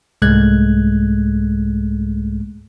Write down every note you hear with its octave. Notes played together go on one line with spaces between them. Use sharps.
C2 G#2 G#3 A3 F#6 G#6